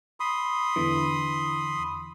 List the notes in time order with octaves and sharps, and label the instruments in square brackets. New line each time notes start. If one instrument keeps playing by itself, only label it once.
[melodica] B5 C6 D#6
[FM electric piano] E2 D3 E3